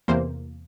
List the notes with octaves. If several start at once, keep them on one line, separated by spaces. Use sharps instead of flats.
E2 C3 E3 A#3 C5